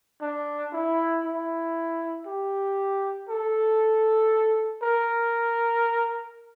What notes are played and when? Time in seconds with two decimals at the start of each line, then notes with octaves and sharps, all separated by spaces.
0.21 D4
0.73 E4
1.25 E4
2.26 G4
3.29 A4
4.83 A#4